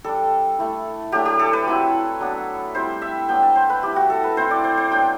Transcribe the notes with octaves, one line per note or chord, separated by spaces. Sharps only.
G3 D4 A4
A3 E4
F#3 A3 D4 G4
G4
A4
B4
F#3 C4 E4
F#3 B3 D4
G3 C4 E4 C5
E5
F#3 B3 D4 G5
A5
C5
B4
G3 C4 E4 G4
F#4
A4
B4
A3 C4 E4 C5
D5
C5
C5
F#3 B3 D4 G5